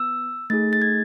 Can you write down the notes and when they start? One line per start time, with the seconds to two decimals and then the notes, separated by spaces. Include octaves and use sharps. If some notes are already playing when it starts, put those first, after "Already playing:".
Already playing: B3 E6
0.50 A3 D#4 G#4 A6
0.73 A6
0.82 G#6